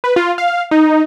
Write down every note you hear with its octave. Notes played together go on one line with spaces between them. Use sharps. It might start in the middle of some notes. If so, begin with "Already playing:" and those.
B4
F4
F5
D#4